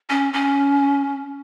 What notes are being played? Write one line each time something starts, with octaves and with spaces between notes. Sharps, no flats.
C#4
C#4